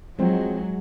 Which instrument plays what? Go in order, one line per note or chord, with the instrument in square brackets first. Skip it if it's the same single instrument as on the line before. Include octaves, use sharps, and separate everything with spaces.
[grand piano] F3 C4 [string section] F#3 [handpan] G#3